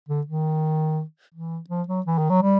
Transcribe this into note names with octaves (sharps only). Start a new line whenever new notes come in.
D3
D#3
E3
F3
F#3
E3
D#3
F#3
G3